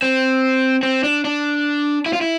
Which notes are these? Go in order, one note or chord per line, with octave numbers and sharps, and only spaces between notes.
C4
C4
D4
D4
E4
F4
E4